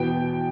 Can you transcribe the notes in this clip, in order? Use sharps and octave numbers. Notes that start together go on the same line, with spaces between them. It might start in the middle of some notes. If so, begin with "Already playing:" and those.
Already playing: E2 B2 B3 G5